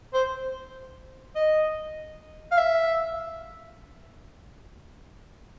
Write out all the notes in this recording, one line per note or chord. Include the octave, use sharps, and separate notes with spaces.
C5
D#5
F5
E5